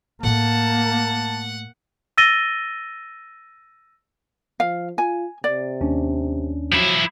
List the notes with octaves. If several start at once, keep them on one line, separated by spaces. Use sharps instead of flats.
A2 A3 A#3 F#5 A5
E6 A6 A#6 D#7 G7
F3 F5
F4 G#5
C3 D5
D#2 C#4 D4
F3 F#3 E4